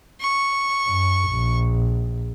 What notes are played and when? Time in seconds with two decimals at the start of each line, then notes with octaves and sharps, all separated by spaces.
0.20 C#6
0.87 F#2
1.29 A#1